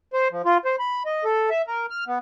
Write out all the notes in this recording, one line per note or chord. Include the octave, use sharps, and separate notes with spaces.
C5
F3
F4
C5
B5
D#5
A4
E5
A#4
F6
B3